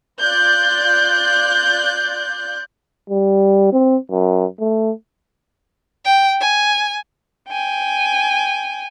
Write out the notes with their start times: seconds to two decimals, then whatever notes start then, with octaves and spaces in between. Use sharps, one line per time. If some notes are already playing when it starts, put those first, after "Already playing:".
0.20 F4 D5 F#6 G6
3.10 G3
3.73 C4
4.11 F#2
4.60 A3
6.05 G5
6.40 G#5
7.49 G5 G#5